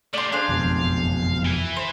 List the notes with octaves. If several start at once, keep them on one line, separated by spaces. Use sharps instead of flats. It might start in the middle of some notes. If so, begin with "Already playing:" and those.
A3 G4 D5 C6
D4 G#4 C5 F5
F#1 F2 B2
E3 E4
C5